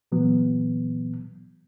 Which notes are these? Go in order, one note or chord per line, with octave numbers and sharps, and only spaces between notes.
A#2 E3 F#3 B3